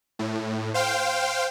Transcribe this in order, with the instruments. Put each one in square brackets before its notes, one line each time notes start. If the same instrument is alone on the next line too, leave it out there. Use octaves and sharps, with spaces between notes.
[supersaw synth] A2
C5 F5 G5